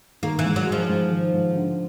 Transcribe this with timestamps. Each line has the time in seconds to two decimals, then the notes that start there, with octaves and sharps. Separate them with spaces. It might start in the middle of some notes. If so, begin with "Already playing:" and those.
0.23 D#3 A#3
0.39 E3
0.44 G#2
0.56 F#3
0.66 G#3
0.72 F3
0.89 G#2
1.10 D#3
1.33 G#2
1.55 D3